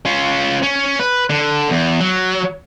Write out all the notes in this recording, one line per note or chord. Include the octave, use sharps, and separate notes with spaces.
C#4 F4
C#4
B4
D3
E2
F#3